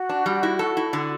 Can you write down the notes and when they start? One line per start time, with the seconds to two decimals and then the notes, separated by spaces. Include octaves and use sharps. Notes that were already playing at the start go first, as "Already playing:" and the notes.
Already playing: F#4
0.09 D4
0.26 G3
0.43 E4
0.59 A4
0.77 E4
0.93 D3